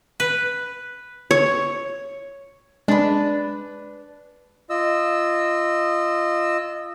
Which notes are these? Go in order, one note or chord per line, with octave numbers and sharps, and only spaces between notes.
B4
C#5
G#3 D4 B4
F4 D#5 E6